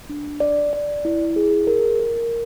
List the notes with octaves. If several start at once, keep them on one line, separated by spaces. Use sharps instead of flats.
D4
D5
D5
E4
G#4
A#4
A#4